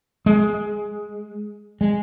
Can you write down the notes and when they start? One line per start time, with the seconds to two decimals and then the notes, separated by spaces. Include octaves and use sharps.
0.26 G#3
1.81 G#3